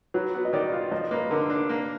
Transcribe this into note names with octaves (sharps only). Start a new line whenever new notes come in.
F#3 B4
B3
D#5
D#3 D5
F4
F3 D#5
A#3 B4
D3 A#4
D4
A#3